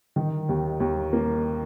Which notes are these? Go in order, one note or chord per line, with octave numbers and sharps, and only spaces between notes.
D#3
D#2
D#2
A#3